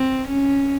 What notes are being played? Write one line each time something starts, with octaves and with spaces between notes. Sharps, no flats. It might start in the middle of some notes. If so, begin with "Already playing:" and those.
Already playing: C4
C#4